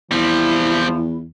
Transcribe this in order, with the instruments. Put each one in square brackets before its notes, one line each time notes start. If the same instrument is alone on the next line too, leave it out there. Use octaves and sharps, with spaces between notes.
[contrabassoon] E2 [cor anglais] F3 [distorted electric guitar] G3 C4 [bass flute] E4